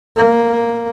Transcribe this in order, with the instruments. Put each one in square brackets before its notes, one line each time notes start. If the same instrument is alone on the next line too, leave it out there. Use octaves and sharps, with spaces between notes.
[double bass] A#3